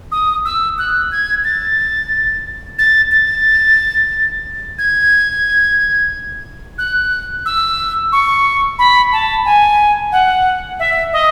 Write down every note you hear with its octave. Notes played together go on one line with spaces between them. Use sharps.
D#6
E6
F#6
G#6
A6
A6
A6
G#6
F#6
E6
C#6
B5
A5
G#5
F#5
E5
D#5